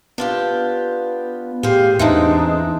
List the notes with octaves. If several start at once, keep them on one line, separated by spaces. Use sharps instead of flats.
B3 D4 F4 G4
A2 G4 G#4 C5 F5
E2 E3 G#3 C4 D4 D#4